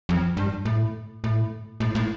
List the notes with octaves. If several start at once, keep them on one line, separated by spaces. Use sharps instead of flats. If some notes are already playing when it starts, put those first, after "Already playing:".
F2
G2
A2
A2
A2
A2